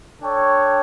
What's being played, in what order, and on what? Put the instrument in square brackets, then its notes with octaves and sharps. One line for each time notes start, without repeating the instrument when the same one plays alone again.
[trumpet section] D4 A4 C#5 G5